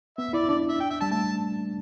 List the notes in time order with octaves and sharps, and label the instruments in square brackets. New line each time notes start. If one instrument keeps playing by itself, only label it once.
[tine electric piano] B3 [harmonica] E5
[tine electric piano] E4 [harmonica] D5
[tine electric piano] D4 [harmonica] D5
[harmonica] E5
G5
E5
[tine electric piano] G3 [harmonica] A5
[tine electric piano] A3 [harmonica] A5